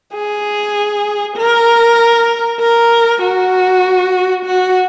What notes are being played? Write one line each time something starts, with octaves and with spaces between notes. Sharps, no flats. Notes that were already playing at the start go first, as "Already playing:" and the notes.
G#4
A#4
A#4
F#4
F#4